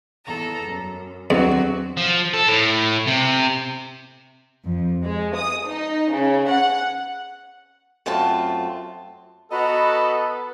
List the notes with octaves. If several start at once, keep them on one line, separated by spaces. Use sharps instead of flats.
E2 A4 A#5
F#2
E2 F#3 C4 D4 F#4
F3
A4
A2
C3
F2
G#3
D#6
D#4
C#3
F#5
F#2 A3 C4 F4 A5
B3 F#4 A4 D#5 A#5 B5